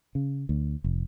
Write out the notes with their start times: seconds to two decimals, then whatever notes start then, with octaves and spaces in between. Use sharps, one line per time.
0.15 C#3
0.49 D2
0.84 F1